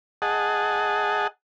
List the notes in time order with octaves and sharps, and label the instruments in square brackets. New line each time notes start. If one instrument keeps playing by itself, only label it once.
[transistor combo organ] G#4 D#5 F#5 A5